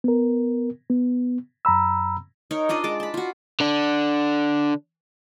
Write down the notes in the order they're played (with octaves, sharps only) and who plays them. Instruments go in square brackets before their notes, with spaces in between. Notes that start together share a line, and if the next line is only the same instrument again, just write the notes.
[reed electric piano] B3 A#4
B3
F#2 A#5 B5 E6
[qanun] D#4 A#4 C#5
D4 F4 D5 D#5
G#3 A5 D6
A5 B5
F4 F#4
[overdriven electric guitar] D3 D4